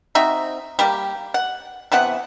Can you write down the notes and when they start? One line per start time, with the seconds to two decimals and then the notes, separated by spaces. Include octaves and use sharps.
0.15 C4 D#4 F#4 E5
0.79 G3 A#3 G4
1.34 F#5
1.92 C3 E3 B3 F#5